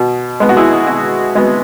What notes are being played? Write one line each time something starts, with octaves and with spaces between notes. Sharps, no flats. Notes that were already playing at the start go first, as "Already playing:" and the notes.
Already playing: B2
G#3 B3
F#4
E4 G#4
B2 F#4
G#3 B3 F#4